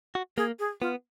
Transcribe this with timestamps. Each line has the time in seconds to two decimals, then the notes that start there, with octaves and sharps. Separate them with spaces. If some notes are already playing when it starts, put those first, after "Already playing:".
0.15 F#4
0.37 A#3 G#4
0.59 G#4
0.81 B3 F4